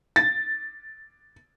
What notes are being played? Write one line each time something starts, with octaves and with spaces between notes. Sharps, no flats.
A6